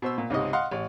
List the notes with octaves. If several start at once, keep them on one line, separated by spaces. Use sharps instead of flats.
B2 C5 E6
A#2
C#2 G#2 C3 D#5
D#5 F5 F#5 C6 F6
A1